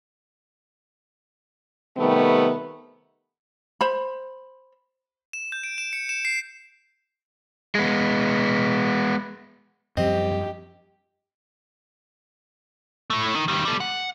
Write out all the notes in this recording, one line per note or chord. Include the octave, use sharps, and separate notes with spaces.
C3 D#3 G3 A3 B3
C5 B5
E7
G6
D7
E7
C#7
E7
C7
G#3 B3
F#2 F3 G3 C4 G4 D#5
A2 A3
D#3 D#4
D#3 G3
G3 A4
F#5